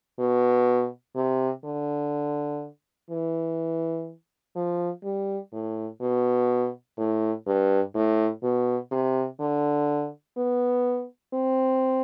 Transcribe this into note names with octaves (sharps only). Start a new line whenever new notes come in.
B2
C3
D3
E3
F3
G3
A2
B2
A2
G2
A2
B2
C3
D3
B3
C4